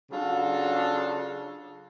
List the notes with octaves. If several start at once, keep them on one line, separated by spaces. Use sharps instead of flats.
C#3 F#3 D4 F4 F#4 A4